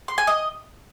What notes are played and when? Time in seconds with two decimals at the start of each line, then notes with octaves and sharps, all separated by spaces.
0.08 C6
0.18 G#5
0.27 D#5